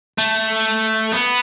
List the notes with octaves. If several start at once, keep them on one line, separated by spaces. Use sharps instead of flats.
A3
B3